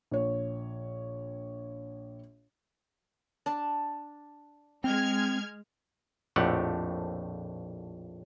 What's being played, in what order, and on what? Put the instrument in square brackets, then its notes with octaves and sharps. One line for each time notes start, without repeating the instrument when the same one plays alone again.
[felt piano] A#1 C#5
[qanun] D4 A5
[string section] G#3 F6 G#6 [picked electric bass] C4
[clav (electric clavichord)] A#1 F2 A2 A3 G4 F#5